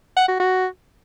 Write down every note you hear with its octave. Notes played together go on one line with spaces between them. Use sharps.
F#5
F#4
F#4